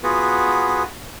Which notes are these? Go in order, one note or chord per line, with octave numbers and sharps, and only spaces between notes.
B3 F4 F#4 G#4 B4